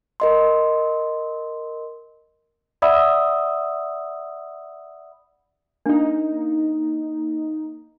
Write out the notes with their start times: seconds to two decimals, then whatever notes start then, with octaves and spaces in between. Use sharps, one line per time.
0.20 A#4 D#5 C6
2.82 D5 E5 F#5 B5 D#6 E6
5.86 A#3 D4 D#4